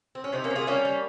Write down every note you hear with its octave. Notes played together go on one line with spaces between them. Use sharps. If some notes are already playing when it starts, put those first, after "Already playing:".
C4
C#4
C3 C4 D#4
A#3 C#4
C3
F4 G#4
G3 A#3 C#4
G3